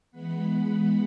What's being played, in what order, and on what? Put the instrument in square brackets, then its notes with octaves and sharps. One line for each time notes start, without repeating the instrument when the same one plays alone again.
[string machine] E3 G#3 B3 F#5 B5